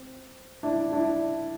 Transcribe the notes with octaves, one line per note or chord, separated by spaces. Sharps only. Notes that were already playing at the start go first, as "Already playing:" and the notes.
Already playing: C4
D4 E4
D4 E4